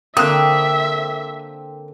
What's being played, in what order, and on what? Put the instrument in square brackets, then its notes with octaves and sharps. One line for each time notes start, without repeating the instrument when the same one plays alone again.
[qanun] D3 A#3 [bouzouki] C4 [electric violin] E5 [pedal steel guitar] D#6 F#6